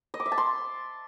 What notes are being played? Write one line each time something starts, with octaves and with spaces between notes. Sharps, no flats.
D#5
D6
E5
A5
C6